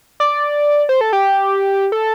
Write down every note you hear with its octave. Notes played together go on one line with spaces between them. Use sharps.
D5
C5
A4
G4
A4